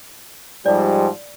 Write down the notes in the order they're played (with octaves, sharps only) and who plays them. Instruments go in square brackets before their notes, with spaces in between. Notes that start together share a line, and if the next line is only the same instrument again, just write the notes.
[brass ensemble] G#2 F3 G3 [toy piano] D5